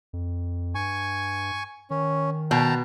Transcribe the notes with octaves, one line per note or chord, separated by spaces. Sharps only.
F2
G2 G#5 C#6
D#3 C#4
B2 G5 A5 A#5